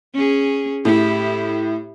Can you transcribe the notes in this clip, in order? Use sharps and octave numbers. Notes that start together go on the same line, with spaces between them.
C#4 G#4
A2 E4 G4